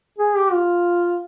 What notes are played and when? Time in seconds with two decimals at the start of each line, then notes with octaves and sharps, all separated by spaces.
0.19 G#4
0.36 G4
0.52 F4